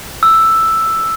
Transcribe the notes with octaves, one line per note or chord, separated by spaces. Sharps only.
E6